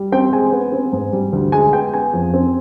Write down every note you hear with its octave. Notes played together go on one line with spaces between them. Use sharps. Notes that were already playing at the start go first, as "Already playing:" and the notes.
Already playing: G3
C4 G5
G#3 G#5
B3
C4
G#2
G3
D2
G#3 G#5
B3 G5
B3 G#5
F2
C4